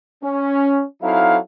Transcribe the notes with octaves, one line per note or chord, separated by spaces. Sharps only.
C#4
F#3 C4 D#4 E4 A4 F5